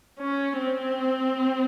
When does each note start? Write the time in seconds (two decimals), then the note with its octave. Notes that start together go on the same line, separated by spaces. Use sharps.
0.20 C#4
0.59 C4